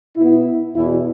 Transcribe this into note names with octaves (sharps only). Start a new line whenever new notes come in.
B2 B3 E4
E2 B2 B3 E4